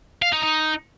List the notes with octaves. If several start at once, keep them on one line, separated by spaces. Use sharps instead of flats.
F5
D#4
D#4